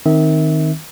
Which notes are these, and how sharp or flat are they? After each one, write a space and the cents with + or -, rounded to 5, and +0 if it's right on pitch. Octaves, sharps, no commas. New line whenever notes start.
D#3 +0 C4 +0 E5 -25